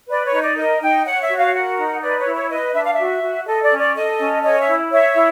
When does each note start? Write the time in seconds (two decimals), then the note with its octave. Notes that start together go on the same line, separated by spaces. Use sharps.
0.09 B4 D5
0.25 C#5
0.33 D#4
0.41 D5
0.56 A#4 D#5
0.81 D#4 G5
1.05 C#5 F#5
1.22 E5
1.29 F#4
1.38 F5
1.53 A#4 F#5
1.77 D#4
2.01 B4 D5
2.18 C#5
2.25 E4
2.34 C#5
2.50 B4 D#5
2.74 D4 E5
2.84 F5
2.93 E5
2.98 F#4
3.22 F#4
3.46 A4 D#5
3.62 D5
3.70 C#4
3.79 D5
3.95 A4 D#5
4.19 C#4
4.43 C#5 D#5
4.59 E5
4.67 E4
4.91 C#5 E5
5.15 E4